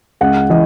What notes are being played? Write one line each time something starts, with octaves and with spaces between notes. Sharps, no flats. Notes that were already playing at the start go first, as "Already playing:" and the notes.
C#2 F#5
E3 D#5